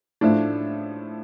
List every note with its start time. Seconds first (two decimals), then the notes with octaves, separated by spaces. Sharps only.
0.21 A2 F3 A3 D4